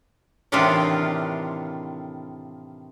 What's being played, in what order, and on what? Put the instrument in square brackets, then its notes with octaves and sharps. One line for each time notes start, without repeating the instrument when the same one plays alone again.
[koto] A2 C3 D#3 E3 D4 F4